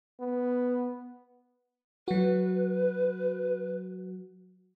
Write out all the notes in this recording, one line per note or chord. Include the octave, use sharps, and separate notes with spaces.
B3
F#3 F#4 B4